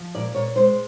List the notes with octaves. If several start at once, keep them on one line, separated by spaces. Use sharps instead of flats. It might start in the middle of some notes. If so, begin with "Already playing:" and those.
Already playing: F3
A#2 D5
A#2 C#5
G#3 C5